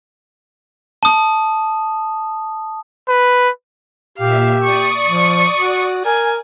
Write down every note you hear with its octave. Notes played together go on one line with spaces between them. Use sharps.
A5 D#6
B4
A#2 G4 E5 F5
D5 C#6 D#6
F3
F#4
A#4 G#5